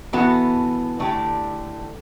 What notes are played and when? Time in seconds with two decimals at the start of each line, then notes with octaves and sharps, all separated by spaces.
0.13 E3 B3 F#4 A4
0.99 D3 A3 E4 G4